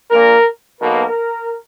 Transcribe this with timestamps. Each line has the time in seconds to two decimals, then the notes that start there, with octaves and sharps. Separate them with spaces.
0.11 A#1 A#2 A#3 A#4
0.81 B1 B2 A#3 A#4